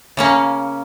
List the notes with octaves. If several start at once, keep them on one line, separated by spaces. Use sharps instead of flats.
C#3 A#3 C#4